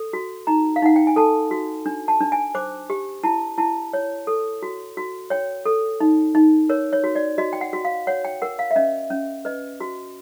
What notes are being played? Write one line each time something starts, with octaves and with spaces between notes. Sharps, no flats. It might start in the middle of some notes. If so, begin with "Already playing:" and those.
Already playing: A4
F#4
D#4 A#5
F5
D#4 F#5
G5
G#5
A4 A5
F#4
D4
A5
D4
G#5
C5 D6
G4
E4 A5
E4 A5
C#5
A4
F#4
F#4
C#5 G5
A4
D#4
D#4
A#4 C#5
C#5
F#4
D5
F#4 D#5
G5
F#5
F#4
F5
C#5 F#5
G5
A#4 F#5
F5
E5
C#4 D#5
C#4
B4 D#5
F#4